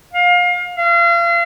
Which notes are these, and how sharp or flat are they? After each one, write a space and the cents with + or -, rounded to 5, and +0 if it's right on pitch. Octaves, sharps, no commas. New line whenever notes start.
F5 +30
F5 -35